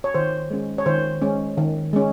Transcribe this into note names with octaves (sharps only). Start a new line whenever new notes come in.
C#5
D#3 C5
G#3 C#4
C#5
D#3 C5
G#3 C#4
D#3
G#3 C#4